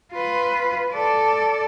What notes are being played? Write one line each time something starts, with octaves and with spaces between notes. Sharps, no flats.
F4 B4
A4 D5